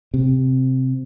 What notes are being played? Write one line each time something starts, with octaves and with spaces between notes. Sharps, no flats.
C3